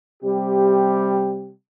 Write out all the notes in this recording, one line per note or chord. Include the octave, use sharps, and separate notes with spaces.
C3 G3 G4